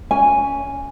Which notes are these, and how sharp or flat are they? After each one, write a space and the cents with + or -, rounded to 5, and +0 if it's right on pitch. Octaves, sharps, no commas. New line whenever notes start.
C#4 +15 G#5 -5